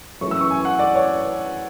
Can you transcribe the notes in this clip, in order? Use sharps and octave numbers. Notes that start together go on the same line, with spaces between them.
F#2 E3 A3 C#4 E4 C#6
E6
C#6
G#5
F#5
D5
C#5